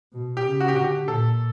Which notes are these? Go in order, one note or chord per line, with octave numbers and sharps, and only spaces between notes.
B2
G4
C#3
F#4
G4
D3 F#4
G4
A#2 A4